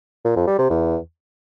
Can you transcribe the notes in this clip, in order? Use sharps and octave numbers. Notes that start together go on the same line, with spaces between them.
A#2
F2
G3
C3
E2